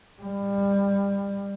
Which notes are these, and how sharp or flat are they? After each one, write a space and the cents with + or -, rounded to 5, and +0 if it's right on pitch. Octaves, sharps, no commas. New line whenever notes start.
G3 +25